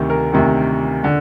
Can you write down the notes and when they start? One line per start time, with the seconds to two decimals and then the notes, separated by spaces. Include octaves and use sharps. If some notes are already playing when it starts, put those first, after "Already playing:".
Already playing: D2 C3 D#3
0.10 A#4
0.33 D2 C3 D#3
1.04 D3